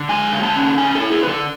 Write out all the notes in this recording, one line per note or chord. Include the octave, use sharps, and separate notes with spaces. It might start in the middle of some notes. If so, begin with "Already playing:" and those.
Already playing: D3
G#3 G#5
D3
A5
C#4
D3 G#5
E4 A4
G#4
D3 B4
A4